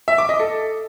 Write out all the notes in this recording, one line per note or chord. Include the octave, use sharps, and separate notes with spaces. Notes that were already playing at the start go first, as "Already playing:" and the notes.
E5
D6
D#5
A4